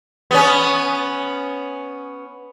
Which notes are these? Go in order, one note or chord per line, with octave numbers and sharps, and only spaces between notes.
B3 C#4